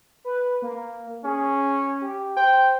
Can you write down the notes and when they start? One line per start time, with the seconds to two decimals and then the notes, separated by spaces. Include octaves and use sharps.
0.25 B4
0.62 A#3
1.24 C#4 G#4
2.01 G4
2.37 C5 G5